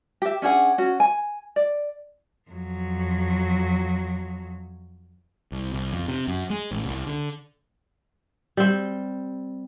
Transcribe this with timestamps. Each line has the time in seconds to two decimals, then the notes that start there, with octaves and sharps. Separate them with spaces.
0.22 G4 E5
0.42 C#4 D4 G#4 F#5
0.78 C#4 F#4
1.00 G#5
1.56 D5
2.50 F2 F#3
5.52 C2
5.73 C2
5.93 F2
6.08 C3
6.28 F#2
6.50 G#3
6.71 A1
6.85 C2
7.06 D3
8.57 G3 C4